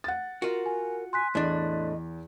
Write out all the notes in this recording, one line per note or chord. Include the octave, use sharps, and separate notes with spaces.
F#5 A6
F4 F#4 A#4
G#5
G#5 C6 F#6 B6
E2 A2 D4 D#5